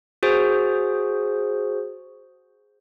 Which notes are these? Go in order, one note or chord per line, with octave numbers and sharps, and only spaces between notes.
F#4 G#4 C5